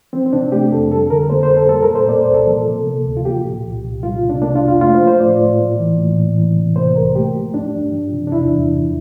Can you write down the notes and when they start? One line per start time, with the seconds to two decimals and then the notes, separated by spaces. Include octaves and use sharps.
0.13 F3 C4
0.26 C4
0.33 C3 D4
0.52 A3 G4
0.72 F2 A4
0.91 G3 A4
1.10 D3 A#4
1.30 A#3 C5
1.43 C5
1.49 F2
1.56 A4
1.69 G3 A4
1.83 A#4
1.89 A#2
1.95 C5
2.08 A#3 D5
2.21 C5
2.28 C2
2.34 A4
2.47 F3
2.67 C3
2.86 A#3
3.06 D2
3.17 F4
3.25 F3 G4
3.44 A#2
3.64 C2
3.84 C2
4.03 G3 F4
4.23 C3
4.30 D4
4.42 A#3 D4
4.55 F4
4.61 F2
4.68 F4
4.81 A3 F4
4.94 C5
5.01 F3
5.07 C5
5.20 A2 D5
5.39 A2
5.59 A#3
5.79 E3
5.98 A2
6.18 A2
6.37 E3
6.57 C3
6.76 A#3 C5
6.95 C2 A#4
7.15 A3 G4
7.35 F3
7.54 G2 D4
7.74 G2
7.93 F3
8.12 C3
8.27 D4
8.32 E2 E4
8.51 E2
8.71 F3